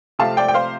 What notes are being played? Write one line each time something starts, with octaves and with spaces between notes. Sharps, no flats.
C3 F3 A3 C4 F5 A5
D5 G5
G5
C5 F5